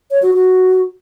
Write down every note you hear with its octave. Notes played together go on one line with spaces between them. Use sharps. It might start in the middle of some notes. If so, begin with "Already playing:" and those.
C#5
F#4
F#4